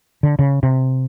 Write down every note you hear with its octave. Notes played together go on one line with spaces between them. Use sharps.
D3
C#3
C3